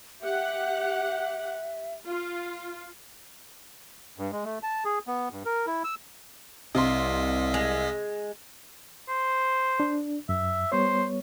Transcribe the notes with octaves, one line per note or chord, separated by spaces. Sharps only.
G4 E5 F#5
F4
G2
G#3
A3
A5
G#4
B3
G2
A#4
E4
E6
C2 C3 D#5 F5 C6 B6
G#3
C5
D4
F#2 E5
G3 B3 C5 C#5